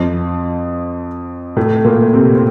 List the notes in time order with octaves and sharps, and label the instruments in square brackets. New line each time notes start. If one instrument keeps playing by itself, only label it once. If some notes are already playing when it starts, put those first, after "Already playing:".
Already playing: [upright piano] F2 F3
A2 A3
A#2 A#3
C3 C4
C4